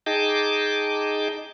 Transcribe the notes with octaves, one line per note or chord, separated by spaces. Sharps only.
D#4 G#4 D#5 G5 A5 D6